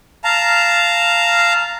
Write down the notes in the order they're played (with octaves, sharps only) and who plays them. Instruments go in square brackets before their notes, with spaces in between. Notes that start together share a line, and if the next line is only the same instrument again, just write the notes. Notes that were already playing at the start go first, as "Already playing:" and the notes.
[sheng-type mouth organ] F5 A5 A#5